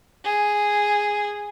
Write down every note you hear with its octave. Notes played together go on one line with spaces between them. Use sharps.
G#4